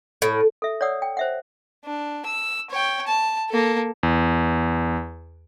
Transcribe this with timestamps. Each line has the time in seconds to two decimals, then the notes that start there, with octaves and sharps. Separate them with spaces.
0.22 A2
0.62 A4 E5
0.81 C#5 D5 F#5 D#6 E6
1.02 G5
1.17 C5 E5 F#5
1.85 D4
2.25 E6
2.70 C#5 G5
3.07 A5
3.49 A#3 A4
4.03 E2